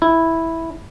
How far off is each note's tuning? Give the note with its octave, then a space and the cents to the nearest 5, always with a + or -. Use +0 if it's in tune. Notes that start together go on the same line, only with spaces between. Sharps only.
E4 -5